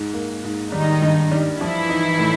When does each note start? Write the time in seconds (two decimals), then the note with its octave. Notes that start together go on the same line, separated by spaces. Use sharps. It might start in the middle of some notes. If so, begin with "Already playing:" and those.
Already playing: G#2
0.13 A#3
0.44 G#2
0.72 D#3 G3 D#4
1.02 G2
1.31 G3
1.60 E3 F3 E4
1.89 D#4
2.19 A2